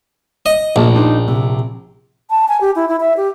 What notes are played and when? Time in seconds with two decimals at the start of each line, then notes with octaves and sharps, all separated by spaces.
0.46 D#5
0.76 A#1 A#2 D#5 A5
0.94 D4 D#4 C5
1.28 C3
2.30 A5
2.48 G#5
2.61 G4
2.76 E4
2.88 E4
3.00 E5
3.17 G4